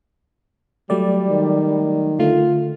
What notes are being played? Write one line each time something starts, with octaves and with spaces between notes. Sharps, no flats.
F#3 G3 A3 D5
D#3
D3 A3 F4